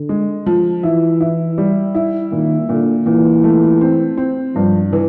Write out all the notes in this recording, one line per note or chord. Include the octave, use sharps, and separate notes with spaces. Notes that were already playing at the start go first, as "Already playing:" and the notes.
Already playing: D3
G#3
F3
E3 E4
E4
G3
E4
A#2 D#3
A#2 D3
A#2 E3
A3
C4
C4
G2 F3
E3